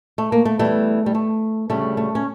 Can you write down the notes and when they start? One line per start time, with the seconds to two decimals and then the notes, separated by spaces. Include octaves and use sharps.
0.18 A3
0.32 A#3
0.45 A3
0.59 E2 E3 G3 A3
1.06 G3
1.15 A3
1.70 D2 C#3 G3 A3
1.97 A3
2.15 C#4